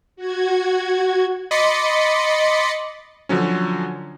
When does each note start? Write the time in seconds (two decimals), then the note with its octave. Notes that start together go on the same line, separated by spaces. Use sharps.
0.16 F#4 G#6
1.51 D#5 B5 C6 D6 A6 C#7
3.29 D3 F3 F#3 C#4